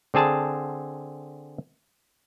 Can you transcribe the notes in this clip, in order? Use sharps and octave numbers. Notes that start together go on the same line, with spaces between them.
D3 C4 G#4 A5